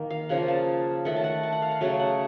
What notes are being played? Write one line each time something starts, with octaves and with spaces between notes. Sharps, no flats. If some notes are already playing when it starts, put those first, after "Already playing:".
Already playing: D#3 A#3
F5
C#3 F3 A#3 F#5
A5
D#3 A3 F#5
A5
F#5
A5
F#5
F5
F#5
C#3 F#3 A3 A5
F#5